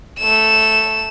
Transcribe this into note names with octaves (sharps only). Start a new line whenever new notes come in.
A3 E7